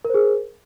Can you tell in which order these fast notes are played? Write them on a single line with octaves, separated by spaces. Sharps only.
A#4 C5 G#4